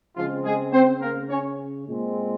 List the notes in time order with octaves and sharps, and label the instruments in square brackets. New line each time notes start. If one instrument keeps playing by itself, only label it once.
[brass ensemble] C#3 F3 G#3 C4 F4
G#3 G#4
C4 C5
A#3 A#4
C#4 C#5
A#2 G#3 C4